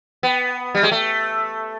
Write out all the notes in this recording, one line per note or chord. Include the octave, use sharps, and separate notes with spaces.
B3
G3
G#3
A3